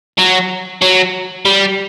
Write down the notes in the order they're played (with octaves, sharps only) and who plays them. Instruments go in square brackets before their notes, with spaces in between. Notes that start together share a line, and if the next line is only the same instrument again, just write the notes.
[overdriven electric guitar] F#3
F#3
G3